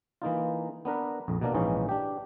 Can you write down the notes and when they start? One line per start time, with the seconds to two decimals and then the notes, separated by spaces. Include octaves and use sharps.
0.22 E3 A#3 D#4 F4
0.85 B3 D4 A#4 B4
1.28 A#1 F2
1.41 B2 A#3 D4 A#4
1.54 A#1 G#2 E3 C#4 D#4 F4
1.89 D4 G4